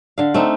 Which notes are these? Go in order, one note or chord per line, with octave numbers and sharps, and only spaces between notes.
D3 F5
A3 C4 D#4